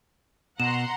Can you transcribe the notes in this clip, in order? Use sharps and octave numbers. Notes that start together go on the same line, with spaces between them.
B2 F#5 A#5 C6 E7